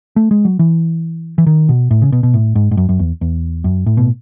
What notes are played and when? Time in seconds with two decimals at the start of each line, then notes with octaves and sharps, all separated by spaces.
0.16 A3
0.31 G#3
0.45 F#3
0.59 E3
1.38 E3
1.47 D#3
1.69 B2
1.91 A2
2.02 C#3
2.12 B2
2.23 B2
2.34 A2
2.55 G#2
2.71 G#2
2.77 F#2
2.89 F#2
2.99 E2
3.21 E2
3.64 F#2
3.86 A2
3.97 B2